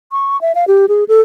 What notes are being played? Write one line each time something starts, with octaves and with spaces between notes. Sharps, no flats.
C#6
E5
F5
G4
G#4
A4